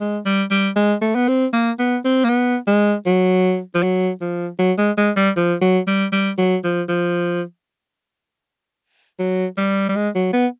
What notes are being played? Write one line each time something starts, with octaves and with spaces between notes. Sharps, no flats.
G#3
G3
G3
G#3
A3
B3
C4
A#3
B3
C4
A#3
B3
G#3
F#3
F3
F#3
F3
F#3
G#3
G#3
G3
F3
F#3
G3
G3
F#3
F3
F3
F#3
G3
G3
G#3
F#3
B3